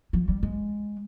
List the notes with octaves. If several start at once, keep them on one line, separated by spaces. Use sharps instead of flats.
F3
G3
G#3